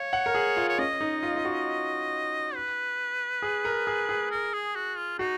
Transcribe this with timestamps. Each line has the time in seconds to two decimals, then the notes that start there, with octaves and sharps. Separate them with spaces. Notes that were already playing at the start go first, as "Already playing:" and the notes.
Already playing: C#5 F5
0.13 F#5
0.26 A#4
0.35 G#4
0.57 F4
0.69 C#5
0.79 C#4 D#5
1.01 D#4
1.23 F4
1.36 F4
1.45 F#4
2.55 B4
3.42 G#4
3.65 A#4
3.87 G#4
4.09 G#4
4.31 A#4
4.53 G#4
4.75 F#4
4.97 F4
5.19 D#4 F#4